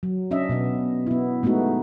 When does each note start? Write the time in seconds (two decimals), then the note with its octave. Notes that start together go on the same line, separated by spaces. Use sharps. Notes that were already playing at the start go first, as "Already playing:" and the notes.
0.03 F#3
0.31 C#4 D4 D#5 E5
0.49 B2 B3 D#5
1.07 B3 E4
1.43 G#3 A3 B3 D#4 F#4